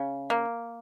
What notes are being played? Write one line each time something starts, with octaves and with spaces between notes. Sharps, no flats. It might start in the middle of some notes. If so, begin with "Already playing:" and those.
Already playing: C#3
A#3